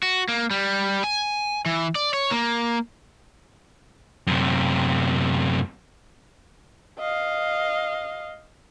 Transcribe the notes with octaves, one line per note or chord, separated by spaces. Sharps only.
F#4
A#3
G3
G#5
E3
D5
C#5
A#3
F#2 C3
D#5 F5